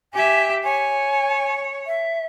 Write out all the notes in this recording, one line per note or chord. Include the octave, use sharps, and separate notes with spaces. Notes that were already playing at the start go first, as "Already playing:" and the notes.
G4 E5 G#5
C#5 G#5
E5